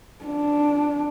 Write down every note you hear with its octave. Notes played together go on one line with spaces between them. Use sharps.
D4